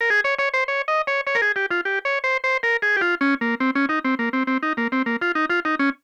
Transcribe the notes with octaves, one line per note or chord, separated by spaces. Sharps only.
A#4
G#4
C#5
C#5
C5
C#5
D#5
C#5
C#5
A#4
G#4
G4
F4
G4
C#5
C5
C5
A#4
G#4
G4
F4
C#4
A#3
C4
C#4
D#4
C4
A#3
C4
C4
D#4
A#3
C4
A#3
F4
D#4
F4
D#4
C#4